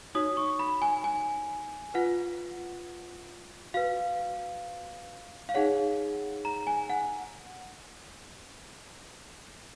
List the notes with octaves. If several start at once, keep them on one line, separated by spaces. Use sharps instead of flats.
D#4 F#4 C#5 D#6
C#6
B5
G#5
G#5
F4 B4 F#5
F#4 B4 F5
F5
D#4 G#4 C#5 F#5
A#5
G#5
F#5